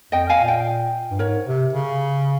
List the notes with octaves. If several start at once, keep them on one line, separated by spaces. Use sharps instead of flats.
F2 D#5 G5
F5 G#5
A#2
D#5 G5
G2
G#2 A#4 C#5
C3
C#3